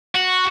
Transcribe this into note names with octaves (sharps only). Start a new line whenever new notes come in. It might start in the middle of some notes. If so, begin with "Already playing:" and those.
F#4